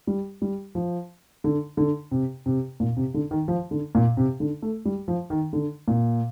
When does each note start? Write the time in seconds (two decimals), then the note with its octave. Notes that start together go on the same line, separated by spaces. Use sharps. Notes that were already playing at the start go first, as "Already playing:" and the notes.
0.07 G3
0.42 G3
0.75 F3
1.44 D3
1.77 D3
2.11 C3
2.46 C3
2.80 A#2
2.97 C3
3.14 D3
3.31 D#3
3.48 F3
3.71 D3
3.95 A#2
4.17 C3
4.40 D3
4.62 A3
4.85 G3
5.08 F3
5.30 D#3
5.53 D3
5.88 A#2